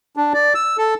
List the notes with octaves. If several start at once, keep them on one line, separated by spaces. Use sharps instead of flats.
D4
D5
E6
A4